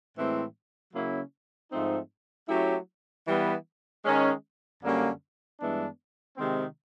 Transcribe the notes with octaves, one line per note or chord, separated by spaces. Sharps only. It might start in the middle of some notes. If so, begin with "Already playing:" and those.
A2 E3 G#3 C4
C#3 F#3 A#3 C#4 E4
G#2 F3 A3 C4 D#4
F#3 A3 C#4 E4 G4
E3 G3 B3
D#3 G#3 C#4
F#2 D3 G3 A#3 C#4
G2 E3 G#3 B3 D4
C3 D#3 G#3 C4